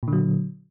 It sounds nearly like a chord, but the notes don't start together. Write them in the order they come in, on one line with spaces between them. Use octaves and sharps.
A#2 D3 F#3